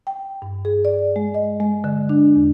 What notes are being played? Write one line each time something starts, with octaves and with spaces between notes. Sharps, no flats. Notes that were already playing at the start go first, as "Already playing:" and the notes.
G5
G2
G#4
D5
G#3
D#5
G#3
D3
D4
E2